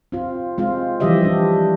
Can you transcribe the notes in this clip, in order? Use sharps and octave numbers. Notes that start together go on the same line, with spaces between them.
C4 F4
G#3 C4 F4
E3 F3 G3 G4 D#5 E5
G3 D4